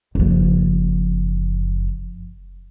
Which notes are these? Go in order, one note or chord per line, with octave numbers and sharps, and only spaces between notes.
F#1 F3